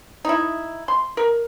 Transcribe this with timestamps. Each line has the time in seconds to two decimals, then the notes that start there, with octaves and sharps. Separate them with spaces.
0.25 D#4 E4
0.88 C6
1.17 A#4